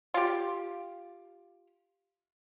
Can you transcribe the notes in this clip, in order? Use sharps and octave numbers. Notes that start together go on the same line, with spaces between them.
F4 G4